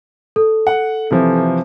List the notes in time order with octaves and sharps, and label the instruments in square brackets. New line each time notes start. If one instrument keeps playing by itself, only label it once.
[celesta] A4
[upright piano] F#5
C3 E3 F3